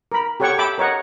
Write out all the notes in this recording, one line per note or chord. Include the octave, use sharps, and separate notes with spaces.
A#4 B5
G4 A4 C#5 F#5 G5 C#6
E5 G5 A5 B5 D6
A#4 C#5 D#5 F#5